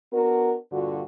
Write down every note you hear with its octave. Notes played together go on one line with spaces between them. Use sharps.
B3 D4 F#4 A#4
G2 A#2 D3 F4 F#4